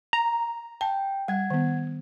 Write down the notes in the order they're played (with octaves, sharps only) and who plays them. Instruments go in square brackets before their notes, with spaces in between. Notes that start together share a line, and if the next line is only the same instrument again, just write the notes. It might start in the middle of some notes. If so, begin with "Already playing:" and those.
[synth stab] A#5
[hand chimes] G5 [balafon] A5
[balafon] G3 [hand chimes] F#5 G#6
[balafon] D#3 B3